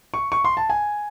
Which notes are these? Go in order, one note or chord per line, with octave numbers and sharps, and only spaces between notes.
C#6
C#6
C6
A5
G#5